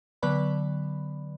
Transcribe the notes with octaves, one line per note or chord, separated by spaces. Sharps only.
D3 F#3 B3 B4 D5 B5